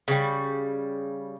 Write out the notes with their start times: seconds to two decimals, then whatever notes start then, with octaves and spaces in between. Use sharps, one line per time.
0.08 C#3 G3